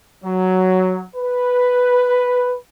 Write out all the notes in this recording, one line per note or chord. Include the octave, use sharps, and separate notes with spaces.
F#3
B4